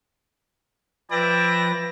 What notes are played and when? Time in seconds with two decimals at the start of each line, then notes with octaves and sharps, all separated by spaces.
1.11 F3 B4 D5 E5 G5 A#6